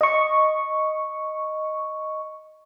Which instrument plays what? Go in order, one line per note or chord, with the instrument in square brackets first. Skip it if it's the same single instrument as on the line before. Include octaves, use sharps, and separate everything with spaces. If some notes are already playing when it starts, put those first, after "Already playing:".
[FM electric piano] D#5 C#6